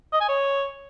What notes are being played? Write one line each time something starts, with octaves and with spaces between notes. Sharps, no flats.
D#5
G#5
C#5